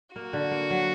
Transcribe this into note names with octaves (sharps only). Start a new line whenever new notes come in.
A#3 F#4
D3
A#3
F#3